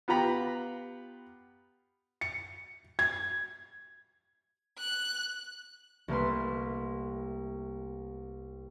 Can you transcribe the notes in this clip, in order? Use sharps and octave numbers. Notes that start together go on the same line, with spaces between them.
B3 F4 G4 A#5 B5
C#7
G#6
F#6
C2 A3 A#3 B4 C6